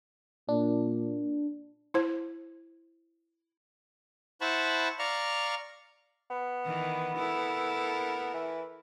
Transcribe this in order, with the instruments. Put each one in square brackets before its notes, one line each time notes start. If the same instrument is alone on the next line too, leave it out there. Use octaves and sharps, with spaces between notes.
[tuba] A#2 [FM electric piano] D4
[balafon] E4 C5
[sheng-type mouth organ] E4 C5 F#5 A5 B5 C#6
D5 F5 A#5 C#6 F6
[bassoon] B3
[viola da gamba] D#3 E3
E4 A4 A#4
[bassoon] E3